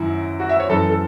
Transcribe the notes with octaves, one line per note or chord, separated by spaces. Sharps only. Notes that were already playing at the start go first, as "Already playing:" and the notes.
Already playing: F#2 D#3 F#3 E4
F#4
E5
C#5
F#2 E3 A4
A4